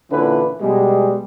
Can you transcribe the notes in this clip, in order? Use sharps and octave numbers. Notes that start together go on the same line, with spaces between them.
A#2 D3 E3 C#4 E4 B4
B2 G3 G#3